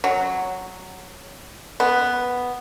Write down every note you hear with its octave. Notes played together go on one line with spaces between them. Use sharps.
F#3
B3